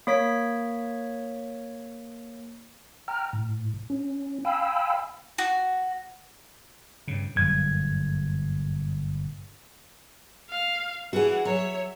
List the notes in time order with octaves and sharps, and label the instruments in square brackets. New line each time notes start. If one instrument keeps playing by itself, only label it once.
[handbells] A#3 C#5 B6
[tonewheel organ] G5 A#5 F6
A2
C#4
F5 G5 G#5 B5 E6
[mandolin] F#4
[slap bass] G2 C#3
[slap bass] G1 A#2 [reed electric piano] F#2 G#6
[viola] F5
[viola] E3 F#5 [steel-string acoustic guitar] F#4 G#4
[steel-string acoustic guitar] F#3 [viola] C#5 E5